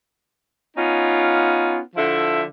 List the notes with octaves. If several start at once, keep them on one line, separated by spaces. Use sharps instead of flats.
B3 C#4 D#4 F4
D3 F3 E4 E5